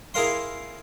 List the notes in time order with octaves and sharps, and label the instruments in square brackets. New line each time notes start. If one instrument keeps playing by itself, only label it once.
[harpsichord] E4 G#4 A#4 F5 C6